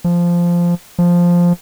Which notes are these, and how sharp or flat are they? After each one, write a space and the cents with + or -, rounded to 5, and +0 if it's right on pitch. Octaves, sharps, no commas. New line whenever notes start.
F3 -10
F3 +0